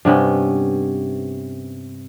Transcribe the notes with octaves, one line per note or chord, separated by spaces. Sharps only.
G2 C3 B3 C#4